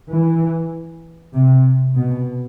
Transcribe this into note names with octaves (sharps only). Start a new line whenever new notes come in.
E3
C3
B2